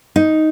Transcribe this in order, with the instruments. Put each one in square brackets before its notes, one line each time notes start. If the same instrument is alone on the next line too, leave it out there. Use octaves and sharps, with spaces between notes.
[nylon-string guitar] D#4